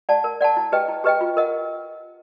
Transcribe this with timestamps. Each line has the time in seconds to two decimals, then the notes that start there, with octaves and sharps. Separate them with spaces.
0.09 D5 F#5 A5
0.24 A#4
0.41 D5 F#5 A5
0.57 E4
0.72 G4 B4 D#5 G5
0.88 E4
1.04 G4 B4 D#5 G5
1.21 F4
1.37 A#4 D#5 F#5